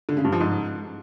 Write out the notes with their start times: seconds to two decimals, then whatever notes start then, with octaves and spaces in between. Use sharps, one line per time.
0.09 D3
0.17 C#3
0.24 G2
0.32 F3
0.40 G#2